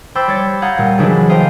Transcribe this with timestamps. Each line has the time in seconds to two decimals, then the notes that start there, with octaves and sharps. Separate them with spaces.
0.15 C5 G5 B5 D6 E6 A6
0.27 G3 C#5 A6
0.62 F5 F#5 A#5 D#6 G6 G#6
0.78 A#2 G3
0.98 C#3 E3 F#3 G#3 D4 B4
1.29 A4 C5 D#5 F5 G5